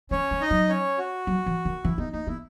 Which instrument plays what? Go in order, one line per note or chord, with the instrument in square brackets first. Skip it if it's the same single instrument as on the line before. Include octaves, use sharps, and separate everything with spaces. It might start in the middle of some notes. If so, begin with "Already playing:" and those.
[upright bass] G#3 [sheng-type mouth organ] C#4 C#5
[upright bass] G#3
[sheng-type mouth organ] D#4 D#5
[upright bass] F#3
[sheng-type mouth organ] C#4 C#5
F#4
[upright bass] F#3
E3
D#3
[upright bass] E3 [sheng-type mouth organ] E4
[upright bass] B3 [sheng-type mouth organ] D#4
[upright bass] A#3 [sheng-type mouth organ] D#4
[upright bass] B3 [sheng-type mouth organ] E4